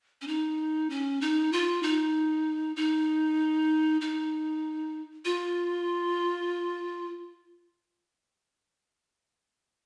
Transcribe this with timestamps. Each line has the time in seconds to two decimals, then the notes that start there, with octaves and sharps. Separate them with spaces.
0.22 C#4
0.28 D#4
0.90 C#4
1.21 D#4
1.52 F4
1.83 D#4
2.76 D#4
4.01 D#4
5.25 F4